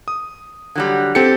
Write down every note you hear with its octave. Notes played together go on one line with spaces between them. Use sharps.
D#6
D3 F#3 G3
C4 G4 A4 C#7